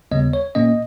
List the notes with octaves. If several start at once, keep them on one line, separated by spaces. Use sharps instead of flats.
D#2 C#3 G3 B3 D#5
C#5
A#2 A#3 C#4 D#5